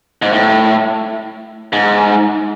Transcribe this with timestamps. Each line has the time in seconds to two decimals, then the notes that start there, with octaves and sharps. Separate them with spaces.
0.22 G#2
0.33 A2
1.73 G#2